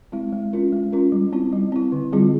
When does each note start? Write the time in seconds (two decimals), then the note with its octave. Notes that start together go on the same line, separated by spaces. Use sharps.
0.12 G#3 C4 E4
0.33 G#3
0.53 C#4 F4 A#4
0.73 G#3
0.92 C#4 F4 A#4
1.12 G3
1.33 C4 E4
1.53 G3
1.72 C4 E4
1.92 D3
2.12 G3 C4 F4 G#4